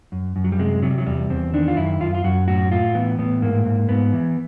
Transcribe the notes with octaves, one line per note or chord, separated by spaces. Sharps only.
F#2
F#2
F#3
G3
C3 G#3
C3 F#3
G3
F#3
E2 G3
E2 C4
D#3 D4
F4
F#2 E4
F#2 F4
F4
F#2 F#4
A2 F#4
A2 F4
E3 B3
A2 B3
G#2 A#3
G#2
G#2 B3
E3